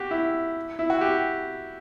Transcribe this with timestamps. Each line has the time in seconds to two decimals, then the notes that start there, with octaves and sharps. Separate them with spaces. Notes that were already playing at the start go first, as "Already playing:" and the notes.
Already playing: F#4 G4
0.11 E4
0.79 E4
0.90 F#4
1.01 G4